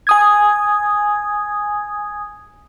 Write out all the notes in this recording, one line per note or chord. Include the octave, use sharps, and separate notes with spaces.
G#5 D#6 G#6